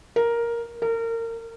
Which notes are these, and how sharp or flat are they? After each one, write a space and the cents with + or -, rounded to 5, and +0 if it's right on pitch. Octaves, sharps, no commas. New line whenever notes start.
A#4 +5
A#4 -30